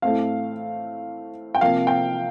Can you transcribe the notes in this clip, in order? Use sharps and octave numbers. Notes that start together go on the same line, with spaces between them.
A2 A3 C4 F5
G5
C3 F3 A#3 F5
G5